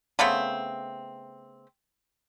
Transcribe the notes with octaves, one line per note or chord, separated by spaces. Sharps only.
C#3 A3 B3 C4